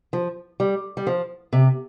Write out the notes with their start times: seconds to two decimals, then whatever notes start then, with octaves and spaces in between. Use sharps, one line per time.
0.13 F3
0.60 G3
0.97 G3
1.07 F3
1.53 C3